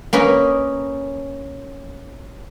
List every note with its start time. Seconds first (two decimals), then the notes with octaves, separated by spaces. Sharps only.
0.13 A#3 C#4 B4 D#5